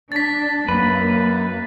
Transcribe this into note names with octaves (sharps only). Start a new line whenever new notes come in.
D4 A6 B6
F#2 A#3 B4